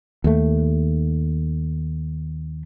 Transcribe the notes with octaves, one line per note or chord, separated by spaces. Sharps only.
D#2 A3